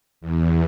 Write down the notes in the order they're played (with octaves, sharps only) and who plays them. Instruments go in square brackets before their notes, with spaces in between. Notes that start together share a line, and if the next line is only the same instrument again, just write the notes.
[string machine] E2